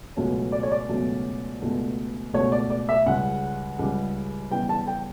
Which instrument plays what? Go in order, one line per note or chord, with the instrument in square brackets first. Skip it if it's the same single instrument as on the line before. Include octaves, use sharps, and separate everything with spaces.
[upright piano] C#2 B2 F#3 A3 C#4
D5
C#5
D5
C#2 B2 F#3 A3 C#4
C#2 B2 A3
C#2 B2 A3 C#5
D5
D5
E5
C#2 C#3 G3 F#5
C#2 C#3 G3
C#3 E3 G3 B3 G5
A5
G5